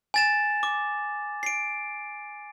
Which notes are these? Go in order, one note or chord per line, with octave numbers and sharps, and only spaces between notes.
G#5 A6 E7
D6
C7 D7